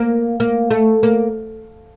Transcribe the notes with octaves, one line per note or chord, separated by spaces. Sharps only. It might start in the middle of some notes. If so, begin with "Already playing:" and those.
Already playing: A#3
A#3
A3
A#3